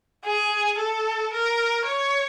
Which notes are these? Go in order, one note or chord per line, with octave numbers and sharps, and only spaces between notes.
G#4
A4
A#4
C#5